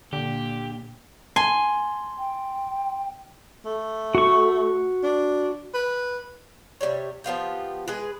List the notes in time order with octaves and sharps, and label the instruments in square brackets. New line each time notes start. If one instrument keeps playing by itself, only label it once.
[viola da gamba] A#2 [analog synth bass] D3 [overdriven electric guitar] G4
[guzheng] G#5 [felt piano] A5 [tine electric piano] C6
[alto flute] G5
[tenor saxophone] A3
[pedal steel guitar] F#4 C#6
[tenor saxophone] D4
B4
[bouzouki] C3 F#3 G3 C#5
F3 B3 F4 G4
G#3 G#4 B4